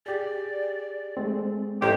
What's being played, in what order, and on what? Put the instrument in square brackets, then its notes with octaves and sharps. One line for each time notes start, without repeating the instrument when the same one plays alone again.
[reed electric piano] G4 G#4 [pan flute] D5
[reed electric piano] G#3 A3 C4
[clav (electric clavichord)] A1 [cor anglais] G4 [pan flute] C5 [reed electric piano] E5 A#5 C6